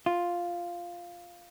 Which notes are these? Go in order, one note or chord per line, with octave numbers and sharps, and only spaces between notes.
F4